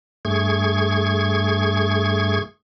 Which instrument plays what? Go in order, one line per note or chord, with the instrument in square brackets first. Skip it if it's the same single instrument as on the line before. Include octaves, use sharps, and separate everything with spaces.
[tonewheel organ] G2 A3 G#4 C#6 G#6